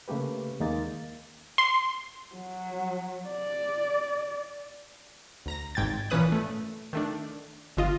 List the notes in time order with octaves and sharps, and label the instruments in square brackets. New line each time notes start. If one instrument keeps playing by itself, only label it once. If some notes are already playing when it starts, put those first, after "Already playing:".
[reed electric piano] C#3 A3 A#3 G4 B4
D#2 G#3 A#3 D#4 A6
[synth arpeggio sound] C6
[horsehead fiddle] F#3
D5
[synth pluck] D2 A#5 A#6
G#1 G#2 G5 G#6 A6
A#2 E3 C#4 B4 D#6 F#6
A3
D#3 A3 D4
G1 D3 F4 D#5